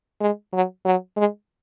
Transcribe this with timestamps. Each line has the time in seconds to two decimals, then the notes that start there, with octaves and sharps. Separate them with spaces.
0.21 G#3
0.53 F#3
0.85 F#3
1.17 G#3